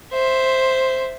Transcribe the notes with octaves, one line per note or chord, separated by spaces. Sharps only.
C5 E5